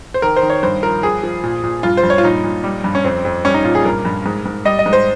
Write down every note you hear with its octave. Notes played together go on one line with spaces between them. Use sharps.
C5
D#3 A#4
C5
D#3
C#5
G2 C5
F3 A#4
F3 G#4
F3
A#2
A#2
G2 F4
C5
G2
C#5
F4
A#2 D#4
A#2
G3
G2
C#4
F2 C4
F2
G3 C#4
D#4
A#2 F4
G#4
G2 A#4
G2
G#2
G#2
G3 D#5
D#5
G#2
C5